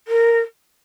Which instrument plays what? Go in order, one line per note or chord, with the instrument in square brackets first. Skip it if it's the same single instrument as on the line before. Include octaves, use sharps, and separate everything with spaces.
[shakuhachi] A#4